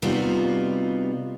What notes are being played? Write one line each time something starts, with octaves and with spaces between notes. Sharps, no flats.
C3 G3 B3 D#4 F4 F#4